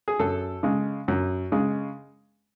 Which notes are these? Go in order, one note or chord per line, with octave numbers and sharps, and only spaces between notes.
G#4
F#2 A4
C#3 G#3
F#2
C#3 G#3